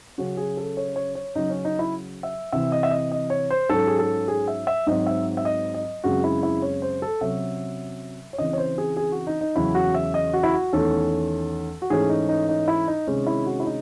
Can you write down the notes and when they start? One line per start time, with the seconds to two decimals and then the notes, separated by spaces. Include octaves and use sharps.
0.18 C#3 F#3 C#4 F#4
0.37 G#4
0.57 A4
0.77 C#5
0.96 C#5
1.15 C#5
1.35 C#3 F#3 C#4 D#4
1.50 C#4
1.65 D#4
1.79 E4
2.23 E5
2.52 C3 E3 C4 E5
2.72 D#5
2.83 E5
2.91 D#5
3.12 D#5
3.30 C#5
3.50 C5
3.69 G#2 F#3 C#4 A4
3.87 G#4
3.99 A4
4.28 G#4
4.48 E5
4.67 E5
4.87 G#2 F#3 C4 D#5
5.07 E5
5.37 E5
5.45 D#5
5.74 D#5
6.04 F#2 C#3 G#3 C4 F#4
6.24 E4
6.43 E4
6.62 C#5
6.82 C5
7.02 A4
7.21 C3 F#3 C#4 E5
8.33 C#5
8.38 C#3 E3 C4 D#5
8.53 C#5
8.58 C5
8.78 G#4
8.97 G#4
9.12 F#4
9.27 D#4
9.41 D#4
9.56 E2 C#3 F#3 C#4 E4
9.75 F#4
9.94 E5
10.14 D#5
10.33 F#4
10.43 E4
10.53 F#4
10.73 E2 D#3 A3 C#4 A4
11.82 F#4
11.90 G#2 E3 A3 C#4 G#4
12.09 D#4
12.29 D#4
12.49 D#4
12.68 E4
12.88 D#4
13.07 C3 D#3 G#3 C#4
13.26 E4
13.46 F#4
13.60 E4
13.66 D#4